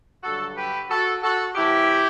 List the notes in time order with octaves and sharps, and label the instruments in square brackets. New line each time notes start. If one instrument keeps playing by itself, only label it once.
[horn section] G2 D3 F#3 F#4 A4
G4 B4
F#4 A4
F#4 A4
C3 E3 A3 E4 G4